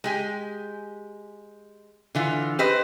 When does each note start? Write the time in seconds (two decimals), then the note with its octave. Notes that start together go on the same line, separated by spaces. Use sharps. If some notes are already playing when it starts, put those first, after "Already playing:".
0.04 G#3 G4 G#5
2.15 D3 E3 F4
2.59 G4 B4 C5 D#5